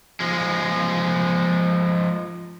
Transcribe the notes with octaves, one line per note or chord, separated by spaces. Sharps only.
F3 G#3